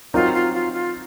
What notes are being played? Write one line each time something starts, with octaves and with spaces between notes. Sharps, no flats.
F#3 C4 D#4 F4 A#4
F4
F4
F4